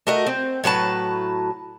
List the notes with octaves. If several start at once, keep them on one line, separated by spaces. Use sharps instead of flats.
A3 F#4 A#4 D#5
C4
A2 F#3 B4 A5